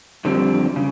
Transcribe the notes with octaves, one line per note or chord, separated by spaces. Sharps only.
F2 D3 G3 C4
C#3